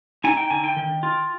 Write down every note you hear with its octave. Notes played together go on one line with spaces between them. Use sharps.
D#4 G#5
G5
D3 G#5
G5
D#3
F4